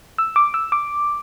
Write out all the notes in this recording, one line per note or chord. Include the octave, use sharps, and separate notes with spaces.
E6
D6
E6
D6